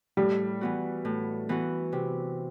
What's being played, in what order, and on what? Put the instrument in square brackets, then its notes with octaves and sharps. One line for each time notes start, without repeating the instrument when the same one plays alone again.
[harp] A2 [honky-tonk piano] G3
[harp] E3 B3 F#4
A2
E3 B3 F#4
C3